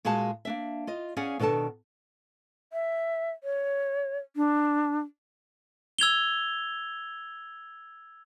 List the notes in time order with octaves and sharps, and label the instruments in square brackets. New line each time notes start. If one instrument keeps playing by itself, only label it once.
[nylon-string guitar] A#2 G#3 F#4 G#4 F5 A5
A#3 D4 E5
F4 D#5
C#4 G#4 D5 F5 F#5
B2 D#3 D4 A4 A5
[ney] E5
C#5
D4
[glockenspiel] E6 G#6 F7 G7